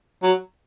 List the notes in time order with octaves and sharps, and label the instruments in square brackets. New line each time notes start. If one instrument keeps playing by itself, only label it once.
[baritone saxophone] F#3